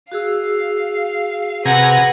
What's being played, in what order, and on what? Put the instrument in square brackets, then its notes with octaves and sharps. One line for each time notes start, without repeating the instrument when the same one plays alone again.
[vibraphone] F#4 G#4 E6 [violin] F5
[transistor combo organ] C3 G#5 A#5 [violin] B4 [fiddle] F#5